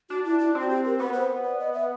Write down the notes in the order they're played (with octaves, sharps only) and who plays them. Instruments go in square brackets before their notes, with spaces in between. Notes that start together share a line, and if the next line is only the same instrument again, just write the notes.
[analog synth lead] D4 [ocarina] F#4
[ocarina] E4
E4
[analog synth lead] C4 [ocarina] F#4
[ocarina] G4
A#4
[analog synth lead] B3 [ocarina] B4
[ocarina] C5
D5
D#5
E5